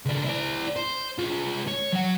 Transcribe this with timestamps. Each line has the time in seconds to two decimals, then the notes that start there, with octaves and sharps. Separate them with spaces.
0.05 C#2 D4
0.25 E4 D5
0.76 C5
1.18 G#3 F4
1.68 C#5
1.93 F#3 F#5